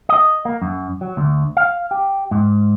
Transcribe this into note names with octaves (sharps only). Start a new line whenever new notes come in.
D#5
A#3
F#2
F#3
D2
F5
G4
G#2